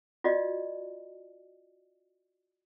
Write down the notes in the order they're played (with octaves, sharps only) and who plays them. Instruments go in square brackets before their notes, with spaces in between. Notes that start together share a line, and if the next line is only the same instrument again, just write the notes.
[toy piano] F4 F#4 D5 D#5